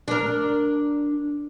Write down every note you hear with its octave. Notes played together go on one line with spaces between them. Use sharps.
D4 A#4